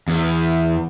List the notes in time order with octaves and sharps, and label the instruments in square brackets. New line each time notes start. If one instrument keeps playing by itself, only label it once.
[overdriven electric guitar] E2